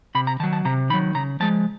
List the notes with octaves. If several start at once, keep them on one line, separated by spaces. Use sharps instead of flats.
C3 B5
A#5
D#3 F#3 A5
A5
C3 A#5
D#3 F#3 B5
C#3 A#5
F3 G#3 A5